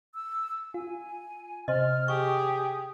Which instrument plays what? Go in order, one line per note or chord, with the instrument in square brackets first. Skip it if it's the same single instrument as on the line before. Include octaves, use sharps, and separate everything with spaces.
[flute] E6
[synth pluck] F4 [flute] G#5
[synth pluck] C3 C5 [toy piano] D#5 [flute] F6
[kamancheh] G4 G#4 [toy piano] C#6 [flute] D#6